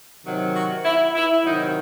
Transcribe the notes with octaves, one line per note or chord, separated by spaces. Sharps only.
C3 D#3 F#3
F#4
E4
E4
C3 D#3 F#3 D#4